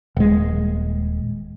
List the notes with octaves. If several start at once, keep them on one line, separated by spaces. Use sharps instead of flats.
D#1 G#3